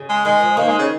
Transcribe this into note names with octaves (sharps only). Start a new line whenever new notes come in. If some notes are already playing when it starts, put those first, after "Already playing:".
Already playing: C#3
G#3
D#3 G#3
F3
D#3 A#3
G#3
C#3